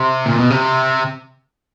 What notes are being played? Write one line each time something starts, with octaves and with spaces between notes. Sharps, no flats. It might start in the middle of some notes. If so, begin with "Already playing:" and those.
Already playing: C3
A#2
B2
C3